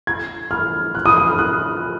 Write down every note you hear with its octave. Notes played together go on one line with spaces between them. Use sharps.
G#6
F6
F#6
D#6
D#6
F6
F#6